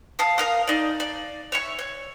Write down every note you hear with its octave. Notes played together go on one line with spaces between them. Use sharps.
F5 A5 D#6
A#4 F5 D#6
D#4 D5
D5
C#5 E5 C#6
C#5